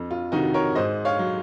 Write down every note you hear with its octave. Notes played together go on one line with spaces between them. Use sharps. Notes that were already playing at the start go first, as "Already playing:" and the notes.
Already playing: F2
F4
C3 D#3 D#4 F#4
A#4 C#5
G#2 C5 D#5
C#5 F5
F#3